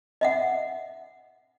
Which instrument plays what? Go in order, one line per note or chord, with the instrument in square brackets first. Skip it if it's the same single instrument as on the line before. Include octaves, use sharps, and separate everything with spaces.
[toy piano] D#5 E5 F#5